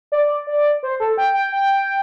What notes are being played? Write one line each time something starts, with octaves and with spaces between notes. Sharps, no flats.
D5
D5
C5
A4
G5
G5
G5